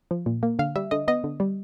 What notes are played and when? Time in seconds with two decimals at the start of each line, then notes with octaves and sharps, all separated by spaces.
0.11 F3
0.26 A#2
0.43 A#3
0.59 D3 F5
0.76 G3 E5
0.91 D3 D#5
1.08 B3 D#5
1.24 D3
1.40 G3